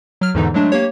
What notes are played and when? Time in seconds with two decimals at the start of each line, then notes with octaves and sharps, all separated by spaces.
0.21 F#3 F6
0.34 E2 G#2 D3 E3 D#4
0.54 F#3 G#3 A3 D4
0.72 A#3 G4 C#5